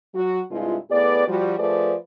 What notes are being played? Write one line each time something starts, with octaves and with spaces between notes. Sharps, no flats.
F#3 F#4
G2 C3 G#3 E4 F4
A2 B3 G#4 B4 D5
F3 G3 F#4
F3 A3 G#4 B4 C5 D5